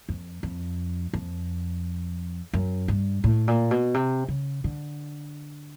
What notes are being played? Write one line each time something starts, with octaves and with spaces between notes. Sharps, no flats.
F2
F2
F2
F#2
G2
A2
A#2
B2
C3
C#3
D3